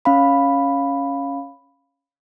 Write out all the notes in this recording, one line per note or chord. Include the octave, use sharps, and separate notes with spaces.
C#4 F5 B5